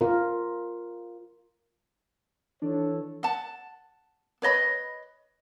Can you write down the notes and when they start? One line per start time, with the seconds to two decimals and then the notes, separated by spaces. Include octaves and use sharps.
0.01 F4 A#4
2.62 E3 D4 A4 C#5
3.23 F#5 A5
4.42 B4 C#5 D#5 B5